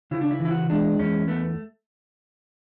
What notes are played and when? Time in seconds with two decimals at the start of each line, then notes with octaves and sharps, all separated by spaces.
0.11 C#3 E4
0.21 D4
0.31 E4
0.40 E3
0.45 E4
0.51 F#4
0.70 G#3 D4
0.99 E2 C#4
1.28 A3 B3